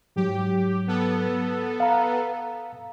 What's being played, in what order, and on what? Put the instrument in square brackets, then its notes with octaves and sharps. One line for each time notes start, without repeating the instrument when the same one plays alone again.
[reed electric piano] G#2 F#3 [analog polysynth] G4
[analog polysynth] B3 A4
[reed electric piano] F5 A#5